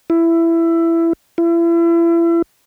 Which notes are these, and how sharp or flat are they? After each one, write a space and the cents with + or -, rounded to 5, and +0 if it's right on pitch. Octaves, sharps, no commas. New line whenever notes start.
E4 +15
E4 +35